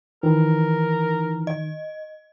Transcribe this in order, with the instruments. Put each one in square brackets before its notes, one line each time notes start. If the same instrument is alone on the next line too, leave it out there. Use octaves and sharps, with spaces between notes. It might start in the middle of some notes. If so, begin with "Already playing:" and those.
[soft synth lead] D#3 [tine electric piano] E3 [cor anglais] A#4
[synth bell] D#5